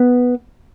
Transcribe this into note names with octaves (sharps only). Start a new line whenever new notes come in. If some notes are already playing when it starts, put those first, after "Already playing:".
Already playing: B3